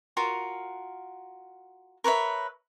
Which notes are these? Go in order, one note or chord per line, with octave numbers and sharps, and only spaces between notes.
F4 F#4 A#4
A#4 B4 C#5 E5